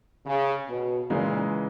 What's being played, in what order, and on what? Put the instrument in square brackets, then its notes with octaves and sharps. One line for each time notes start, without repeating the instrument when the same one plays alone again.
[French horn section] C#3
B2
[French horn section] A#2 [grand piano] C#3 E3 G#3 D#4